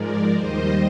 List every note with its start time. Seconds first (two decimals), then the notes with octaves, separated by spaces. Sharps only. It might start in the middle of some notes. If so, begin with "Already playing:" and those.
Already playing: G#2 F3 G#3 A#4 D5
0.34 D#2 D#3 G3 C5 D#5